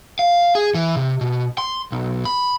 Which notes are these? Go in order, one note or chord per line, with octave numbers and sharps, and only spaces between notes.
F5
G#4
E3
C3
B2
C6
B1
B5